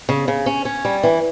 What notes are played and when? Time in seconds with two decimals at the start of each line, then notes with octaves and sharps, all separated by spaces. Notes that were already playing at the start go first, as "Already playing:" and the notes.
0.09 C#3
0.28 C#3
0.46 C#4
0.65 C#4
0.85 G3
1.03 E3